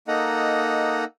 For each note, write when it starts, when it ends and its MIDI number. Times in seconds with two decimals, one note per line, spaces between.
0.08 1.04 58
0.08 1.04 63
0.08 1.04 69
0.08 1.04 75
0.08 1.04 78
0.08 1.04 82